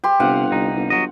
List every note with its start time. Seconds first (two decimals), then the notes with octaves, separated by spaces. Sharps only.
0.04 G4 C6
0.20 G1 C3 F5 F#5
0.52 C2 D#4
0.76 G1
0.90 F#3 D#5